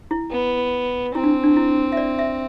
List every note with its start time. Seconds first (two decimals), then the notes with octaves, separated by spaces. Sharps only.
0.11 E4
0.31 B3
1.15 C4 E4
1.24 D4
1.43 D4
1.56 E4
1.92 E5
1.97 D5
2.19 E5